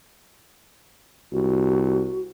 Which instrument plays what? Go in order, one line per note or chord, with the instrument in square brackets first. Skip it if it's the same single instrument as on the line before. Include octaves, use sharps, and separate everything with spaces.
[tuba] C2 [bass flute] F#4